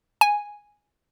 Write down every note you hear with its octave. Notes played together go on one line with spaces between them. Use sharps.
G#5